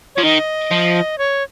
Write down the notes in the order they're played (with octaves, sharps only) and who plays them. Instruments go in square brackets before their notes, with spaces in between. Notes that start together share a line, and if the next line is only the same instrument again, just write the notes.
[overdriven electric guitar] F3 [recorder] C#5
[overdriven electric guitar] D#3 [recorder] D#5
[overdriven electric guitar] F3
[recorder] C#5